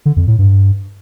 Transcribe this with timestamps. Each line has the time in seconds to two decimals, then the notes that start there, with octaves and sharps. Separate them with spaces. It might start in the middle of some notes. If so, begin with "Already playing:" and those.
0.06 D3
0.17 F2
0.28 A2
0.39 G2